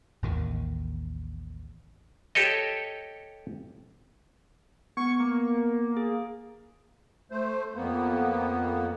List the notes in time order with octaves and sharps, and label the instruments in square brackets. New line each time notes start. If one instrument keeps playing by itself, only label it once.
[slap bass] A1 D#2 D#3
[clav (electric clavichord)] G4 A4 C#5 D#5
[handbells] B3 [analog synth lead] C#6
[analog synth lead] A#3
[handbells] G#4
[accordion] A3 C5
F2 A#3 B3